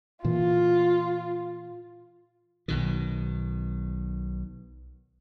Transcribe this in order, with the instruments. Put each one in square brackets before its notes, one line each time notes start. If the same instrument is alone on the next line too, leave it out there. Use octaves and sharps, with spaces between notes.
[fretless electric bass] A#2 E3 [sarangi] F4
[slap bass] B1 B2 D#3